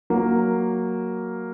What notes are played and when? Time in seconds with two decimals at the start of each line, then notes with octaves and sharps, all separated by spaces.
0.10 F#3 A#3